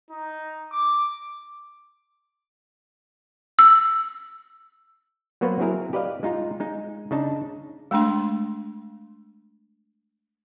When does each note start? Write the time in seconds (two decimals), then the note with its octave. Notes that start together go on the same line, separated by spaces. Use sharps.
0.10 D#4
0.72 D6
3.59 E6
5.41 F#3 A#3 B3 F#4 B4 C5
5.59 F#3 C4 E4 G#4 A#4
5.93 G4 B4 D5 D#5 F5
6.23 G#3 D#4 F4 A#5
6.60 G#3 D#4
7.11 C#3 D4 D#4 A5
7.91 G#3 A3 D4 C6